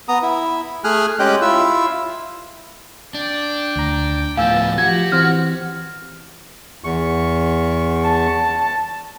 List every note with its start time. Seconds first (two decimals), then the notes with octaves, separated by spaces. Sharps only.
0.09 B3 A#5 D#6
0.23 E4
0.84 A3 G#4 G#5 F6 F#6
1.20 G#3 C#4 G4 D#5 G5 F#6
1.42 E4 F4 E6
3.14 D4 G5 D6
3.76 D2 A#5
4.37 A2 F3 B3 F5 G#5 A5 E6 G6
4.78 F3 F#4 G4 G#6
5.12 E3 C4 C5 F6
6.84 E2 C#6
8.03 A5